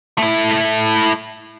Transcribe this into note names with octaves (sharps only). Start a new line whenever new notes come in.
A3 E4